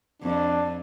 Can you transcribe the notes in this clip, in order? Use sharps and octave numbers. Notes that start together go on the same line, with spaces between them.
F2 D4